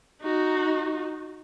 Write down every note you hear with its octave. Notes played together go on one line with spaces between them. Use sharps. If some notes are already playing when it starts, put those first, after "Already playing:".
D#4 F#4